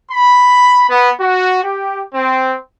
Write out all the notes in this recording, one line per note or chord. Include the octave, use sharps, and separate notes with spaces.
B5
B3
F#4
G4
C4